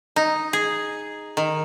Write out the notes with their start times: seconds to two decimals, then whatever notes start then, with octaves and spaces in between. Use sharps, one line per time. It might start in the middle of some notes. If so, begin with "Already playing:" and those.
0.16 D#4
0.53 G#4
1.37 D#3